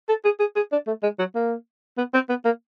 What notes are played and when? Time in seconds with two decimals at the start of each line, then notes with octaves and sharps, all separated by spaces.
0.09 A4
0.25 G#4
0.40 G#4
0.56 G#4
0.72 D4
0.87 A3
1.03 G#3
1.19 F#3
1.35 A#3
1.98 B3
2.14 C4
2.29 B3
2.45 A#3